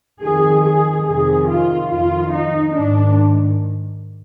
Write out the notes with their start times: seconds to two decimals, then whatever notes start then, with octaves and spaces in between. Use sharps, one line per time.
0.20 F2 D#3 G#4
0.62 G#4
1.04 F2 C3 D#3 G#4
1.48 F4
1.90 F2 D#3 F4
2.32 D#4
2.75 G#2 D#3 D4